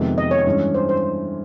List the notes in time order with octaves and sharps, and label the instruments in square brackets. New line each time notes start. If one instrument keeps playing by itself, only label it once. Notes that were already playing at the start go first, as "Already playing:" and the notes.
Already playing: [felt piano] F2 C3 D#3 G#3 B3
[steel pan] D#5
C#5
[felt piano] G2 E3 G#3 C#4
[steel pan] C5
C5